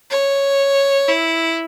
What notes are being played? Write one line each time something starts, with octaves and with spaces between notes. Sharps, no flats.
C#5
E4